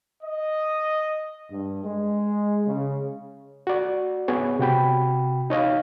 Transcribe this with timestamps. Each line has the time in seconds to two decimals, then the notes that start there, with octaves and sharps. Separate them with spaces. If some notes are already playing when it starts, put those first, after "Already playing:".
0.21 D#5
1.51 G2
1.84 G#3
2.67 C#3
3.67 F#4 D5
4.28 B3 G#4 C#5
4.59 C3 F#4 G5 B5
5.50 D#4 C#5 D#5 F5